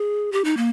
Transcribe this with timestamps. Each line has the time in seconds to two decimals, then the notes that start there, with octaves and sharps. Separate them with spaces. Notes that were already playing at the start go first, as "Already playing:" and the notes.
Already playing: G#4
0.32 G4
0.44 D#4
0.57 A#3